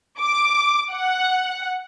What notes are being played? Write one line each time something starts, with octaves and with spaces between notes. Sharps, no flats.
D6
F#5